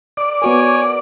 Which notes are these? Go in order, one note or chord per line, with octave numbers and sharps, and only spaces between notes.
D5
B3 F#4 A#4 C#5 G#5